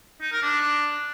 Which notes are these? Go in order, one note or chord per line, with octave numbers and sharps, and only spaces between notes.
D#4
A#4
D4